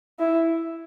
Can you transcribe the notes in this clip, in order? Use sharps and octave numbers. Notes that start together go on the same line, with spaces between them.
E4